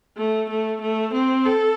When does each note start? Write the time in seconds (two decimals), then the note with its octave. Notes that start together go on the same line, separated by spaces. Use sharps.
0.17 A3
0.49 A3
0.81 A3
1.14 C4
1.46 A4